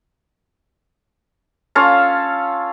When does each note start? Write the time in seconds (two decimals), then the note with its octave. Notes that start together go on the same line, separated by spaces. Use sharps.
1.75 C#4 F4 A4 F5